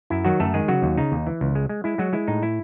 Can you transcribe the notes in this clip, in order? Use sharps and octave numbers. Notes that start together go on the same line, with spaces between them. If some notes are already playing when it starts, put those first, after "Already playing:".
F#2 E4
D#3 F#3 F#4
F#2 A3 A4
D#3 G#3 G#4
C#3 F#3 F#4
D#2
C#3 D#4
D#2
E3
C#2
G#3
G#3
G#3 E4
F#3 G#3 F#4
G#3 E4
A2 D#4
E4